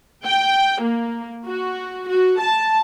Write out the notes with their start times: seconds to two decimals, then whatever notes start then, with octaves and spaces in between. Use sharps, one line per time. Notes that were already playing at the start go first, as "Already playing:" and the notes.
0.24 G5
0.82 A#3
1.46 F#4
2.09 F#4
2.40 A5